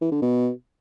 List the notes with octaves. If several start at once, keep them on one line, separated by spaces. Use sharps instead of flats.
E3
D3
B2